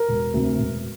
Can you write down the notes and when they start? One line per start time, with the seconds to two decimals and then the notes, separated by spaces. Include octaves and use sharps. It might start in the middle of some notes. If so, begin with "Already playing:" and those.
Already playing: A#4
0.09 E1
0.34 D2 C3
0.58 E1